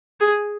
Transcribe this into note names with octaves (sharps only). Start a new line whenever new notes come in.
G#4